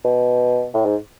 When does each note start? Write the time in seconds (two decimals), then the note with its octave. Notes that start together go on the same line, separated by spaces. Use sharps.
0.05 B2
0.74 A2
0.85 G#2